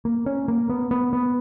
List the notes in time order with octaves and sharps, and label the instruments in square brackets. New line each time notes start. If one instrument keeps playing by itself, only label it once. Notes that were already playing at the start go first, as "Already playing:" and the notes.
[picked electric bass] A#3
C#4
A#3
B3
B3
B3